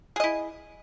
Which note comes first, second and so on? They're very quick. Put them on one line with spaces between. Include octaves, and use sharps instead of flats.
G#4 D#5 E4